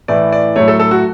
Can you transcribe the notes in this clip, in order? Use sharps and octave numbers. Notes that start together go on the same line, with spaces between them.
A2 E3 A3 D5
D5
A2 F#3 A3 C#5
A4
A4
F#4